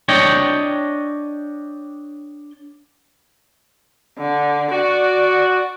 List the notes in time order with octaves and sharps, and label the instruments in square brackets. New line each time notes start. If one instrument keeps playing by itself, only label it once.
[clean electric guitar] D4 C#5 D#5 G5
[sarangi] D3
[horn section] F#4 [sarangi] D5